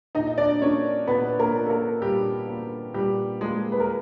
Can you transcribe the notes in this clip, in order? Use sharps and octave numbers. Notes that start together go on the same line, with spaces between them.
A#2 D#4 D#5
D#5
D4 D5
F3 A#3 C#4 C#5
A#2 B3 B4
A#3 A#4
F3 A#3
A4
A#3 A#4
A#2 G3 G4
F3 A#3
A#2 G3 G4
F3 G#3 A#3 G#4
B4
A#4